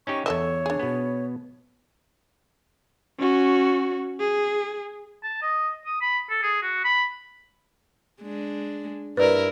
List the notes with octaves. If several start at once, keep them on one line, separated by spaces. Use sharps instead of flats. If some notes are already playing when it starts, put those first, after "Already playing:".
C#4 D#4 G4 C#6
E2 A4 A#4 C#5 D#5 E5
D4 G#4
B2 B3
C#4 F#4
G#4
A5
D#5
D#6
B5
A4
G#4
F#4
B5
G#3 D4
G2 E4 A#4 B4 D5